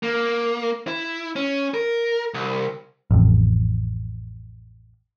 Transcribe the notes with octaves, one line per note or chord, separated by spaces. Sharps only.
A#3
E4
C#4
A#4
C2
A1 F2